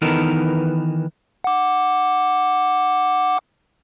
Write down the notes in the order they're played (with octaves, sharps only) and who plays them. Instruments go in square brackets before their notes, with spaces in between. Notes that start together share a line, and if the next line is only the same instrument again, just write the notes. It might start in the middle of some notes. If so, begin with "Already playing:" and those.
[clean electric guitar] D#3 E3 B3 D#4 A4 A#4
[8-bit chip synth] F#5 D6